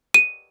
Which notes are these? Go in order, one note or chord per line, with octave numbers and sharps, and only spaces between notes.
D#7